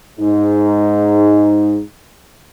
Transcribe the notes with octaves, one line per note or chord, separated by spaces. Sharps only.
G#2 D#4